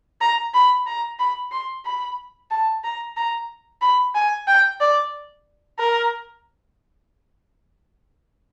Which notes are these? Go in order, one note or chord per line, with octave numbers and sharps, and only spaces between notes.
A#5
B5
A#5
B5
C6
B5
A5
A#5
A#5
B5
G#5
G5
D5
A#4